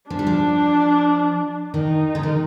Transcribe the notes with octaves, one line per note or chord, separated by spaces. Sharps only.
F3 D4
G3
F3
D#3 D#4
D3
D#3